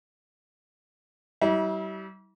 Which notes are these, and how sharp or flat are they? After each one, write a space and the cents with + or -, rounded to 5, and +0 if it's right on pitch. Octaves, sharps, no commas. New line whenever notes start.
G3 -35 E4 -35